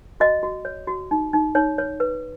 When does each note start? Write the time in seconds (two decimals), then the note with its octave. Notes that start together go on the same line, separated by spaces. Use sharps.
0.20 F#4 D#5
0.43 F#4
0.65 C#5
0.87 F#4
1.11 D#4
1.33 D#4
1.55 D#4 C#5
1.78 C#5
2.00 B4